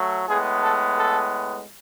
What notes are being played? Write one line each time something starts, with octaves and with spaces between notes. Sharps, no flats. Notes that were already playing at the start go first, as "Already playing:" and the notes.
Already playing: F#3 A3
A2 G#3 B3 G#4
A4
A4